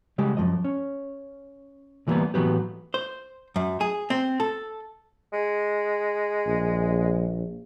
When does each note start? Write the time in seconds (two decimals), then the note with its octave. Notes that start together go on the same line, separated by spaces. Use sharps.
0.18 C#3 G3 G#3 G4
0.37 F#2 A2 F3 D#5
0.65 C#4
2.07 D2 E3 F3 G3 A#3 B3
2.34 A2 E3 F#3 B3 G4
2.94 C5
3.56 F#2
3.81 G#4
4.10 C4
4.40 A4
5.33 G#3
6.47 A#1